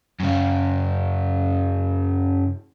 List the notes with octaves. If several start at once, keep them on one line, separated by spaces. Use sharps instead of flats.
F#2 C#3